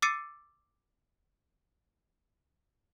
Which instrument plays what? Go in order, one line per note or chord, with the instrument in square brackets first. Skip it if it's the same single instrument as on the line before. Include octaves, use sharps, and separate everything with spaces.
[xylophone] D6 E6 A6 C7 C#7 D#7